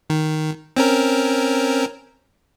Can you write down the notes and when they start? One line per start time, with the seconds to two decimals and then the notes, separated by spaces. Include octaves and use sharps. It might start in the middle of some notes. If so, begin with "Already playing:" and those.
0.10 D#3
0.77 C4 C#4 A#4